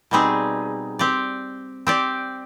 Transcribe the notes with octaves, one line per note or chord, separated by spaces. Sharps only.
B2 G3 C4 D#4 G#4
C4 G4 D5
C4 G4 D5